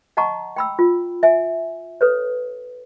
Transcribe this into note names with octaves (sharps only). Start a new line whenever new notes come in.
D#5 F#5 A5 A#5 C#6
G5 B5 E6
F4
E5 G#5
A4 B4 C#5